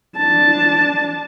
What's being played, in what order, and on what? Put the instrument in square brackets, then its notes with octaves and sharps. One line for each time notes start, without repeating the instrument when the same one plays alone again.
[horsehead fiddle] D4 A5